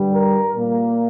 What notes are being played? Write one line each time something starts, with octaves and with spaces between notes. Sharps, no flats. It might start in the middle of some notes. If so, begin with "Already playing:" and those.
Already playing: G2 D3 G3
A#4
A#2 A#3